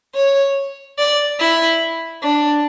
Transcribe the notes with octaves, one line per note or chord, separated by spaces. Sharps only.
C#5
D5
E4
D4